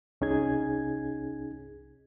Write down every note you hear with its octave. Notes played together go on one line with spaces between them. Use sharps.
C2 C#4 D#4 G#4 G#6